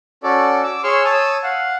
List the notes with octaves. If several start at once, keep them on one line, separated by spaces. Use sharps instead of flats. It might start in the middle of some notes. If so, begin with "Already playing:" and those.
C#4 F#4 A4 D5
D6 E6
G#4 C#5 C6 C#6 E6 F6
C#5 A5 D#6 E6
F5 F#5